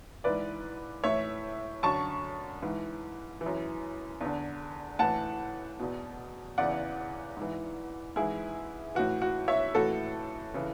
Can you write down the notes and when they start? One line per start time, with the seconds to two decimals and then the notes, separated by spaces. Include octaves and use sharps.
0.24 G#2 E3 B4 D5
1.04 A2 E3 C#5 E5
1.83 F#2 D3 A5 C#6
2.62 G#2 E3
3.41 E3
3.46 F#2
4.21 E2 D3
4.99 A2 E3 F#5 A5
5.79 E2 B2
6.58 E2 C#3 E3 D5 F#5
7.37 G#2 E3
8.16 G#2 E3 E4 G#4
8.95 A2 E3 F#4
9.22 F#4
9.48 C#5 E5
9.75 A2 E3 F#4 A4
10.54 C#3 E3